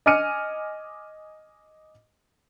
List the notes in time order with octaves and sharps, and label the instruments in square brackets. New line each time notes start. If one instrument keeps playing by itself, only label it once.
[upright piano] D#5 G#5 D6 F6 C#7 D#7